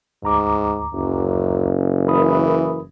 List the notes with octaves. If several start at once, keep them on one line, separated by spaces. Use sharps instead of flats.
D2 G#2 A#5 D6
F#1 F#2
E3 A#4 B5 D#6